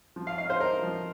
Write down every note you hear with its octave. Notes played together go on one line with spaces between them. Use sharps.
F3
F5
D#4 F5
C5
D#4 A#4
F3